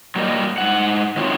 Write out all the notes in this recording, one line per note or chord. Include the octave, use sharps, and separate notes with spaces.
F#3 G3 A#3 G4 A#4 D#5
G#2 F#5
D#3 F#3 C4 F4 C#5